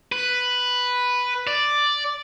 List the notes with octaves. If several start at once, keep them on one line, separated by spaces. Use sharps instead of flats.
B4
D5